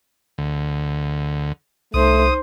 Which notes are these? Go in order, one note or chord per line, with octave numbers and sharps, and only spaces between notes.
D2
C2 A3 D#4 C5 D#6